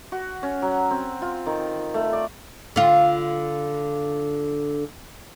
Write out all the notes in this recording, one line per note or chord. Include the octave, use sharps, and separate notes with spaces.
F#4
C#4
F#3
C4
F4
D#3
A3
D5
D3 F4